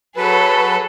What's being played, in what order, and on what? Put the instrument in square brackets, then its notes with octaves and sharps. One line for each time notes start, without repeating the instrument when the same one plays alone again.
[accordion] F#3 B4 [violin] G#4 A4